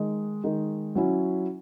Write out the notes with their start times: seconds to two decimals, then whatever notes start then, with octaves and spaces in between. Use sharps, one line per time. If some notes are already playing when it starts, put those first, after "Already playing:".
Already playing: D#3 G#3 D#4
0.44 D#3 G#3 D#4
0.95 F#3 C#4 E4